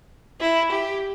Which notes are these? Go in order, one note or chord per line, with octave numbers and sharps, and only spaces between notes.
E4
G4